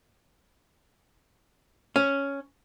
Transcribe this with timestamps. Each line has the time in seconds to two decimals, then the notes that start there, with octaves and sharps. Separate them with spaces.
1.96 C#4